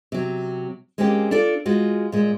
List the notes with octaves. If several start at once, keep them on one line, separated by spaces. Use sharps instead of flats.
C3 F#3
G#3 A#3 C4 C#4 G4
D4 F4 A4 D5
G#3 F4 F#4
A#2 G#3